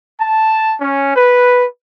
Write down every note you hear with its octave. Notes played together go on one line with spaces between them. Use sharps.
A5
C#4
B4